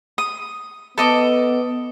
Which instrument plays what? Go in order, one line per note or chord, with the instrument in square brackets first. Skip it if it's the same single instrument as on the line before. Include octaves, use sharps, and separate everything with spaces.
[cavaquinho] D#6
[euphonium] B3 [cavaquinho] A4 D#5 D6